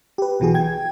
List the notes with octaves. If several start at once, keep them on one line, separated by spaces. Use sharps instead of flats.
G4 B4
B1 B2 E3 F#4 G#4
G5 G#6